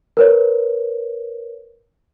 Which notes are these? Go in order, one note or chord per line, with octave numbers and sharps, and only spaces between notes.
A#4 B4 C#5